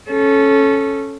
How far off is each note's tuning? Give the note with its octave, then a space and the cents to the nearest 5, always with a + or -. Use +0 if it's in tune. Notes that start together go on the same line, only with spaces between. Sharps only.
C#4 -10 A4 -20